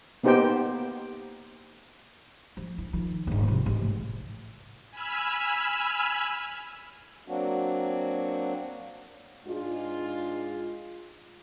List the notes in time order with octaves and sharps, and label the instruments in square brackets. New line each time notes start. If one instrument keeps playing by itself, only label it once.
[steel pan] A#3 B3 D#4 G4 C5 G5
[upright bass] F3
E4
D#3 F3
D#1 G#2
C3 F3
A1 G#2
[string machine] G#5 B5 E6 F6
[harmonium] F#3 A#3 C4 D4 F#4
[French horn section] G#2 G#3 D4 F4